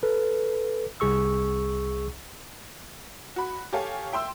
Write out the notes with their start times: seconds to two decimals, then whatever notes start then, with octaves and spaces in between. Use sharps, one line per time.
0.03 A4 B4
1.00 C2 G#4 C#6 E6
3.36 F#4 B5
3.73 G4 A4 C#5 F5 G#5
4.12 E5 G5 C6 E6